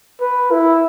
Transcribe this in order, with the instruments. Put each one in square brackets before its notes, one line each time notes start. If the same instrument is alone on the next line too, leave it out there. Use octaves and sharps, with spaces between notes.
[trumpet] B4
E4